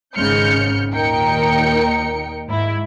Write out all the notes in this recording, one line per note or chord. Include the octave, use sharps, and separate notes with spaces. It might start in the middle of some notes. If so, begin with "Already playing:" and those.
G#1 G#2 C#3 F6 G6 C#7
D#2 A#2 D#4 A#4 G5 C#7
G#2 E4